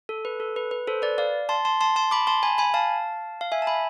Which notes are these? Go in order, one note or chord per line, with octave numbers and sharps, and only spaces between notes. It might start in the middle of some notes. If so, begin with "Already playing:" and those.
A4
B4
A4
B4
B4
A4 C5
B4 D5
D5 F5
A5 C6
A5 C6
A5 C6
A5 C6
B5 D6
A5 C6
G#5 B5
G#5 B5
F5 A5
F5
E5 G#5
A5
G#5 B5